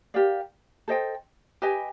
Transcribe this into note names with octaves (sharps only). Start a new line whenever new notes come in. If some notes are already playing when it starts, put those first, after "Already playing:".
G4 A#4 D5 F5
A4 C5 D#5 G5
G4 B4 D#5 G#5